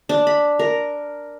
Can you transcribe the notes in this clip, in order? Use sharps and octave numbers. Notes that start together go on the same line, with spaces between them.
D4
B5
A#4